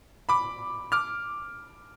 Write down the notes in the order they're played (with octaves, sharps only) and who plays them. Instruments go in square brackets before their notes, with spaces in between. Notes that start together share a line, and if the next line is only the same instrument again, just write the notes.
[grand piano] B5 D6
D6 F6